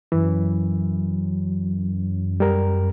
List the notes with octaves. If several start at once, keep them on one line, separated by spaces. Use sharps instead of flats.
F#2 E3
G3 A#4